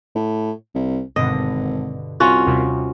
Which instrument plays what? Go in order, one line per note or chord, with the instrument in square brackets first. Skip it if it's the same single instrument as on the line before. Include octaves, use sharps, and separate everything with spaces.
[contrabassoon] A2
C2
[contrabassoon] G#1 [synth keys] G2 B2 D3 [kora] D#5
[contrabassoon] C2 [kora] C#4 F4 F#4
[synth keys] D#2 C3 G3